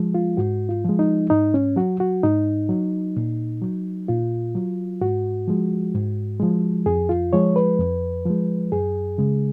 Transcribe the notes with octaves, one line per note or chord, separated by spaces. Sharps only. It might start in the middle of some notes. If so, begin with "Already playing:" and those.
Already playing: F3 G#3
F4
G#2 F#4
F4
F3 G#3
D#4
G#2 D#4
C#4
F#3 F#4
F#4
G#2 D#4
F#3
A#2
F#3
A#2 F4
F#3
G#2 F#4
F3 G#3
G#2
F3 G#3
F2 G#4
F4
F3 G#3 C#5
B4
F2
F3 G#3
F#2 G#4
C#3 G#3